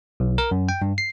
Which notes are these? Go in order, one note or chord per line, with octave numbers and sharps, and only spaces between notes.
B1
A#4
F#2
G5
G2
C7